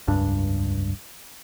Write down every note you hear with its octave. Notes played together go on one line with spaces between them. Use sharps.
F1 C#2 G2 D4